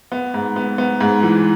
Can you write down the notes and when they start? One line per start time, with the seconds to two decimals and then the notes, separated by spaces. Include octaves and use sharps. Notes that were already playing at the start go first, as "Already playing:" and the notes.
0.12 B3
0.34 G#2
0.56 B3
0.78 B3
1.01 G#2
1.23 E3